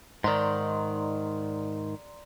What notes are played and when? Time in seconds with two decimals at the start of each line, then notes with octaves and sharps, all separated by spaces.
0.24 G#2 D#3 D5 A#5 C6